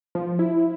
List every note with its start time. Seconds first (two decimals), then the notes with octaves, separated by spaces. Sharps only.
0.15 F3
0.39 E4